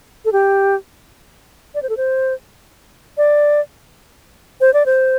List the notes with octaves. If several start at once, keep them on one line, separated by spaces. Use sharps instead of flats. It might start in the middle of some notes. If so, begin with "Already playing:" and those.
A4
G4
D5
C5
A4
C5
D5
C5
D5
C5